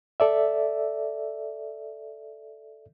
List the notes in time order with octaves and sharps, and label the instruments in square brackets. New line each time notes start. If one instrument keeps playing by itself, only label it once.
[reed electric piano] A4 D5 E5